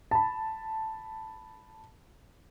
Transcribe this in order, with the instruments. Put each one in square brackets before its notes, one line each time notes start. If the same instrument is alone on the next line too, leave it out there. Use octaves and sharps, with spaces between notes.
[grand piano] A5 B5